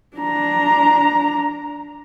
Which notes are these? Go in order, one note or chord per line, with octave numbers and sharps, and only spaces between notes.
D4 A#5